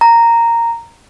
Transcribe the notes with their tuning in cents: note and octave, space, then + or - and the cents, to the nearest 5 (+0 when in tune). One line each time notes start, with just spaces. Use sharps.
A#5 -10